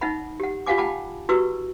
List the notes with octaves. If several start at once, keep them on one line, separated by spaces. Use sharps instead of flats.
D#4 E5 F#5 B5
G4 F#5
F4 G4 F5 F#5 G#5 D6
F#5 G5 A5 B5 D6
E4 F#4 G4 B4 C#6 E6